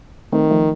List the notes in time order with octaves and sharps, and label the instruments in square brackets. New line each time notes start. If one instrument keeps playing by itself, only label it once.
[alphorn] D#3 [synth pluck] A3 C4
[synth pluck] F3 A3